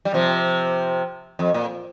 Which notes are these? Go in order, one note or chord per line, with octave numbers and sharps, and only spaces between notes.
G3
C3 F3
F2
A#2